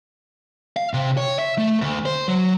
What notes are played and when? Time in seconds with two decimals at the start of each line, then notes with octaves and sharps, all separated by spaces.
0.77 F5
0.93 C3
1.17 C#5
1.39 E5
1.58 A3
1.82 D2
2.06 C5
2.28 F#3